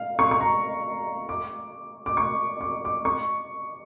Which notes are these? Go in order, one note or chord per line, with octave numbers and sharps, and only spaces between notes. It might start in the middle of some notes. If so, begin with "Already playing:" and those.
Already playing: F5
C#6
C#6
A#5
D6
D6
C#6
D6
D6
C#6